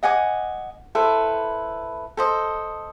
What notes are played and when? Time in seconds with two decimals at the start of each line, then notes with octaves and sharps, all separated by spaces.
0.03 D#5 F#5 G#5 D6
0.95 E4 A4 B4 C5
2.17 A4 C5 D#5